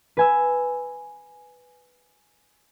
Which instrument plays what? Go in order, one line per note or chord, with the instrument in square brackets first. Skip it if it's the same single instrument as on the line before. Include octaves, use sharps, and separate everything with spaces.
[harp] B4 G#5 E6